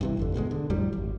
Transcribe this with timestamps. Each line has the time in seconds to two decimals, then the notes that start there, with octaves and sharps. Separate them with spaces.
0.01 G2 C3 E3
0.17 G#1 F2 D3
0.34 D2 B2 G3 G#3
0.51 D3
0.70 F2 A2 F#3 G3
0.93 G#1